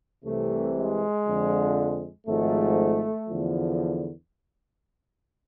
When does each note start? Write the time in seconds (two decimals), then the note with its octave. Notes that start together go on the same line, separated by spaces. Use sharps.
0.25 C2 C3 E3 A3
0.76 G#3
1.26 F2 D3 F3
2.27 G#1 G#2 F3 A3
3.29 E2 D3 F3